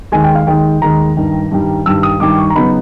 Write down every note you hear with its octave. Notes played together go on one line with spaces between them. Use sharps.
D#2 D#3 G#3 G#5
G5
F5
D#2 D#3 G#3 G5
D#2 D#3 G#3 A#5
G2 D#3 G3
G2 D#3 G3
G2 D#3 G3 E6
D#6
G2 D#3 G3 D6
C#6
A#5
C#3 F#3 B3 D#4 B5